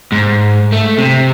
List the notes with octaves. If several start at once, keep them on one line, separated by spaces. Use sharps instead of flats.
G#2
A3
C3